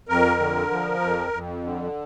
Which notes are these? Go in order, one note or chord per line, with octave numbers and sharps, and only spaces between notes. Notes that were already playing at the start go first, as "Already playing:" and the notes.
F2 A#4
D3
F3
F2
F2
D3